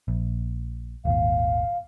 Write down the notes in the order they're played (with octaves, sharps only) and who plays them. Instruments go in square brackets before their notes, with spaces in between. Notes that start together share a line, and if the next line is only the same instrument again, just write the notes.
[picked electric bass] A#1
[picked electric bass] D#1 G#1 D#2 [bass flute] F5